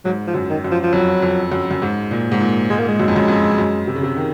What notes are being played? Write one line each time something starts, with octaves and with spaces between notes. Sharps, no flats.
G#2 F#3
F3
F#2
D#3
F#2
F3
F3
F2 F#3
F2
F#2
F#2
G#2
A#2
G#2
A#2
G#2 G#3
A#3
G#3
F#2
F2
F#2
F2
F#2
C3
C#3
C3
D#3